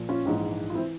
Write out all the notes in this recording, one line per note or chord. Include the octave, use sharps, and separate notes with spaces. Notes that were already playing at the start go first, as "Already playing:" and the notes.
Already playing: A#2 F3
C#4 F4
A#1 G#2 E3
F4
E3 C4 E4